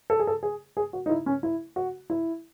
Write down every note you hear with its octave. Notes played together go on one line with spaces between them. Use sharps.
A4
G#4
A4
G#4
G#4
F#4
D#4
E4
C#4
E4
F#4
E4